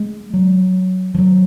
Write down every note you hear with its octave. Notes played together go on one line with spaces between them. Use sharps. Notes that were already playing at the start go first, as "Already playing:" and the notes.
Already playing: G#3
F#3
F3
F#3